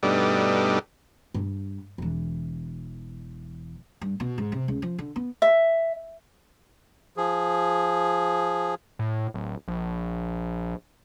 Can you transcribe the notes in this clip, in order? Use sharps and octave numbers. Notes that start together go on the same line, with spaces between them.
G2 B2 G3 A3 D4 D#4
G2
E1 E3
G2
B2
G#2
C3
C#2
F3
D3
B3
E5
F3 G#4
A2
D1
A#1